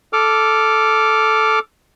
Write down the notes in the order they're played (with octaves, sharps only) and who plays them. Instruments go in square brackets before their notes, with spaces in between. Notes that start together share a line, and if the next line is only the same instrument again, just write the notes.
[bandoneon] A4 D6 F6